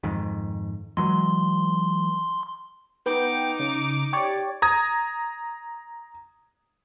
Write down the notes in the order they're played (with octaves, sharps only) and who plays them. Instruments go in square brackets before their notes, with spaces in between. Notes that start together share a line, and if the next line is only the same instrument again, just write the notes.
[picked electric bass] F2 G#2 D#3
[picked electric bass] E3 F#3 G#3 [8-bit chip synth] C6
[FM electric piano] B3 G5 [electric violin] D#4 D6
[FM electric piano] C#3
G4 C#5 D5
[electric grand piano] A#5 D#6 G#6